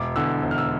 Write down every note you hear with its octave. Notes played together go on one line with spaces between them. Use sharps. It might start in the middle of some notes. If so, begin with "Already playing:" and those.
Already playing: E1 D6
E2 D3 E6
E1
F6
E6